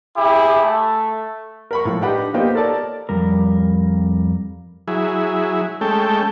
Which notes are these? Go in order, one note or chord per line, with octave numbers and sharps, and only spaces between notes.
E4 G4 G#4
A3
A#4 B5 C#6
A2 F3
D4 D#4 G4 B4 F#5 B5
A#3 B3 D#4 F4 G4 C5
A4 A#4 C#5 D5 A5
F2 G3 A#4
F#3 E4 G#4
G#3 A3 C#4 A4 G5